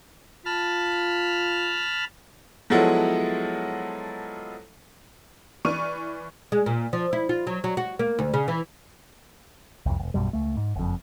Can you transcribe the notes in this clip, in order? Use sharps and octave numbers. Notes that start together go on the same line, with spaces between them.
F4 A5 B5 F6
F3 F#3 G#3 B3 E4 A4
E3 D5 C#6 F6 D#7
G#3
A#2
F3
E4
F4
F#3
F#3
F#4
A#3
D2
C#3
E3
C2 F2
E1 C#2
A#1 F#2 B2 G3
C#2 A3
G#2
F#1 F2